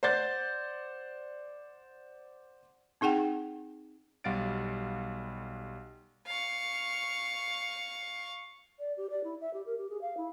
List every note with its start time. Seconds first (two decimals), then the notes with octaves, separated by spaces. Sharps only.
0.03 C5 D5 F#5 G6 A6
3.01 C4 D#4 G#4 F#5 G5
4.24 B1 G3 F5 F#5 A6 D7
6.27 F5 C#6
8.79 D5
8.97 G4
9.10 D5
9.23 E4
9.40 E5
9.53 G4
9.66 A#4
9.77 G4
9.89 G#4
10.01 F5
10.17 E4